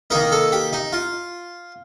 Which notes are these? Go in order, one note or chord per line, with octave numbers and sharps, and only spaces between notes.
D#3 A#3 D#4 A#4
A4
G4
D#4
F4